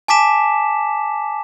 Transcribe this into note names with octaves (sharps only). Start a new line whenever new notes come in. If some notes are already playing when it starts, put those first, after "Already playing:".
G#5 A5 D6 B6 E7